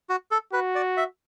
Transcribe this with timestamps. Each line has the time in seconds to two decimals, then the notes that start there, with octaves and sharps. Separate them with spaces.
0.09 F#4
0.31 A4
0.53 F#4 B4
0.75 D5
0.97 E5